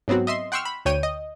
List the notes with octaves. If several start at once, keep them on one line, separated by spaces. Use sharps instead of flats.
G#2 F#3 B3 C4 F#4
D#5 E5 C6
F#5 G5 C6 C#6 E6 F6
B5
D2 C#5 G5 D#7
D#5